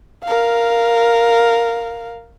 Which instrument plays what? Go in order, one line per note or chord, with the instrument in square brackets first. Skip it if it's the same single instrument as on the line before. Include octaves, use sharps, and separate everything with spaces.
[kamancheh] A#4 F5